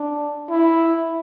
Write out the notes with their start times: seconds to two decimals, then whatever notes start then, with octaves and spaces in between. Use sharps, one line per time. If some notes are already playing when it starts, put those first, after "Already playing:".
Already playing: D4
0.50 E4